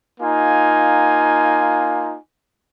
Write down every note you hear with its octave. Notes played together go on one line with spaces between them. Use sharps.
A#3 D#4 F4 G#5